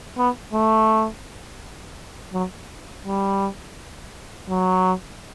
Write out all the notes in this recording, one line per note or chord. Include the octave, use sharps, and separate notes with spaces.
B3
A3
F#3
G3
F#3